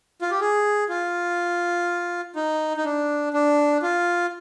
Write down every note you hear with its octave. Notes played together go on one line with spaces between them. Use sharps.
F4
G4
G#4
F4
D#4
D#4
D4
D4
F4